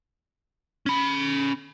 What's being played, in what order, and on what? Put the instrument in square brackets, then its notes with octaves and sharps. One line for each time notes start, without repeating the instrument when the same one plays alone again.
[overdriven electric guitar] C#4 B5